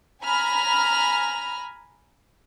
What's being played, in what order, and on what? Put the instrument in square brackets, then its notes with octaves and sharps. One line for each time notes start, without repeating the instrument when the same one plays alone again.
[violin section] G#5 A#5 B5 F6